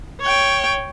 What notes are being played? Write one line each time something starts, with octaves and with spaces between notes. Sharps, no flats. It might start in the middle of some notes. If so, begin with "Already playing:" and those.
C#5 G5